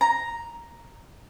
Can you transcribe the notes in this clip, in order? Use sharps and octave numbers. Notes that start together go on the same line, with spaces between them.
A#5